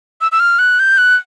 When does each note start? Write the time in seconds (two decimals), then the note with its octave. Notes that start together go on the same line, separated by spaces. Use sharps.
0.21 E6
0.32 E6
0.40 F6
0.59 F#6
0.79 G6
0.98 F#6